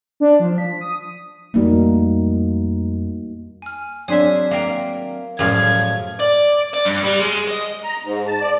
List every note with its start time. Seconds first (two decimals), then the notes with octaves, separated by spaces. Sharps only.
0.20 D4
0.40 F3
0.58 B6
0.81 D#6
1.54 F2 G3 A3 A#3 D#4 F#4
3.62 G#5 F6
4.08 F#3 C4 D4 G#4 C#5 E5 C6 B6
4.51 A#3 A#4 E5 F5 G5
5.39 F#2 A2 F3 G3 G#4 F5 F6 G#6
6.20 D5
6.74 D5
6.86 G2
7.04 G3
7.19 G#3
7.48 D#5
7.83 A#5
8.04 G#2
8.26 A5
8.41 D5